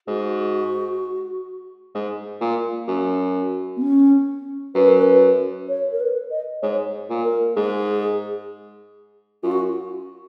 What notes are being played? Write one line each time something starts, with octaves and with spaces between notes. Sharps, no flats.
G#2 F#4
G#2
A#2
F#2
B3
C#4
F#2 B4
A#4
B4
C#5
A#4
B4
D#5
G#2 C#5
A#2
A#4
G#2 G#4
F#2 F4
F#4